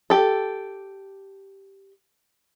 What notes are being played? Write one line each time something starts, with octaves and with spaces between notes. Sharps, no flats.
G4 A4